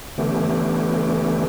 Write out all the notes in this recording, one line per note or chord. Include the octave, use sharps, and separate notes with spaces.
D3 E3 A3 B3 C#4 G4